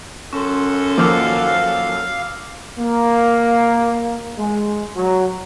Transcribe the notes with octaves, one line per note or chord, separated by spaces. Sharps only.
F#2 F#3 C#4 A4 C6
D#3 F3 A#3 F5 D6 E6
A#3
G#3
F#3